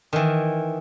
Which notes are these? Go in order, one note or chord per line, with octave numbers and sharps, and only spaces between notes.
D#3 E3